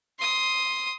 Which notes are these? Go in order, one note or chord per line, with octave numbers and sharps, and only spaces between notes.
C6 D#6